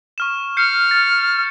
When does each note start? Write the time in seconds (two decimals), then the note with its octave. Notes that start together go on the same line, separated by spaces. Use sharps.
0.18 C#6 F6 E7
0.57 F6 G6 C7 C#7
0.91 A6